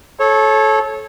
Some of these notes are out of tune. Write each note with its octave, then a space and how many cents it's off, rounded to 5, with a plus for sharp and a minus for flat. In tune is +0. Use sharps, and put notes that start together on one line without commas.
A4 -25 C#5 -20